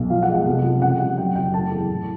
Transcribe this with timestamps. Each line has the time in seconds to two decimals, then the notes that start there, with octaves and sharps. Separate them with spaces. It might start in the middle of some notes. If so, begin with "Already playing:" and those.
Already playing: B1
0.10 F3 F5
0.23 F#5
0.29 G#3
0.34 F#5
0.46 F1
0.64 F3
0.82 C#3 F#5
1.00 G3 F#5
1.18 F#3 G5
1.35 F#1 G5
1.54 A3 A5
1.71 E2
1.89 A2